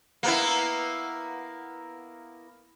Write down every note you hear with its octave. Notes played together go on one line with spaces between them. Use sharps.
A#3 B3 E4